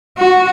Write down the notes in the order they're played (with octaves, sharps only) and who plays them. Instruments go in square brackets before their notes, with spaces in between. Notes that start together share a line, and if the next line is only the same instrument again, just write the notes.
[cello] F#4